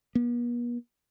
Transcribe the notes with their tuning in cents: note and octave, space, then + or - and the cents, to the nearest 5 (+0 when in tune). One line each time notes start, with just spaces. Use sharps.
B3 -45